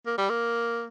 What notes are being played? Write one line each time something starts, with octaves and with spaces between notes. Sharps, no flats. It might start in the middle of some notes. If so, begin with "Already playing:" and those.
A#3
G3
A#3